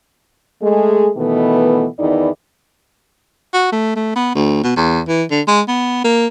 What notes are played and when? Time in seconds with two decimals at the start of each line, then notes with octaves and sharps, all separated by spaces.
0.62 G#3 A3 G#4
1.17 B2 D#3 E3 A3 B3
2.00 E2 D#3 B3 D#4 E4 D5
3.53 F#4
3.72 A3
3.96 A3
4.16 B3
4.35 D2
4.64 B2
4.76 E2
5.08 E3
5.31 D3
5.47 G#3
5.68 B3
6.04 A#3